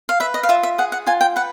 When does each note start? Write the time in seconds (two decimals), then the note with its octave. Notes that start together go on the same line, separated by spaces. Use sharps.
0.09 F5
0.20 B4 E5
0.34 D#5
0.43 F5
0.49 F4 E5
0.63 E5
0.78 G#4 F#5
0.92 F#5
1.07 F4 G#5
1.21 G5
1.36 B4 F#5